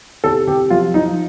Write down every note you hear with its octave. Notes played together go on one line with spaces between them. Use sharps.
C3 A4
C3 G4
F3 F4
F3 D#4